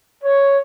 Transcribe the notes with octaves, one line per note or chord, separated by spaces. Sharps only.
C#5